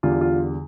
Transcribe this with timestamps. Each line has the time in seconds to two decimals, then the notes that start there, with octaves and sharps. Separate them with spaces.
0.03 E2 D3 G3 F4
0.21 F4